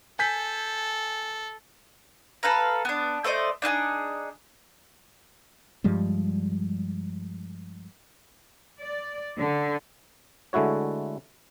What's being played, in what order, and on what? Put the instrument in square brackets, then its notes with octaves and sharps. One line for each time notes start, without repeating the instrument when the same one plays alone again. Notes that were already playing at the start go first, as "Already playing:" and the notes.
[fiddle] A4 [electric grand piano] G#5 G6 B6
[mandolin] A4 B4 F5 A#5
B3 D4
A3 C5 D5 D#5
D4 D#4 F4 G#4
[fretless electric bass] G2 F3 G3 G#3
[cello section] D5
D3
[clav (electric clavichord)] D3 G#3 A3 E4 F#4 C#5